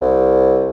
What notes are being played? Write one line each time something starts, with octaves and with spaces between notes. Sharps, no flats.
C2